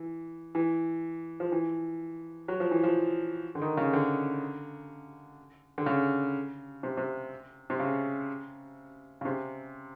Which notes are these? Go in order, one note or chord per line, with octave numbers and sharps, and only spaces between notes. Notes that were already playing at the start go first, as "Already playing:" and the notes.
Already playing: E3
E3
F3
E3
F#3
F3
E3
F3
D3
D#3
C#3
D3
D3
C#3
C3
C3
C3
C#3
C#3
C3